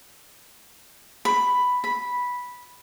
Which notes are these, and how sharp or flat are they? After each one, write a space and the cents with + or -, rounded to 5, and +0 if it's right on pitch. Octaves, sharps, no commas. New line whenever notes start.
B5 +5
B5 -5